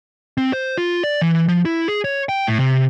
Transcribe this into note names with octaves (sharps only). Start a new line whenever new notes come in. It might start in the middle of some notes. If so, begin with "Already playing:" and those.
C4
C5
F4
D5
E3
F3
E4
G#4
C#5
G5
A2
C3